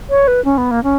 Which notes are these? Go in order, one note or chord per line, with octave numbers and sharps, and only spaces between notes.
C#5
B4
C#4
B3
A#3
C#4